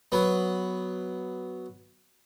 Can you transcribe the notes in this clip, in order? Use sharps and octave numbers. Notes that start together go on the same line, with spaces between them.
F#3 B3